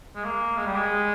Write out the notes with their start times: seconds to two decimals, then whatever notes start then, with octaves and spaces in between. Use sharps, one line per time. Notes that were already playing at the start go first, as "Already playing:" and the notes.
0.15 G#3
0.24 A#3
0.57 G#3
0.66 G3
0.76 G#3